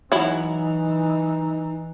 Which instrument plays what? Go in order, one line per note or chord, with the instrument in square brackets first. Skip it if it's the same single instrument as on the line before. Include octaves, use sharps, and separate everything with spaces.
[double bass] E3 [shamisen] F#3 E4 [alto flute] D#4